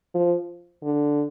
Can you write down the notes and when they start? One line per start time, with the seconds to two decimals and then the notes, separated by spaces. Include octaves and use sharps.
0.15 F3
0.83 D3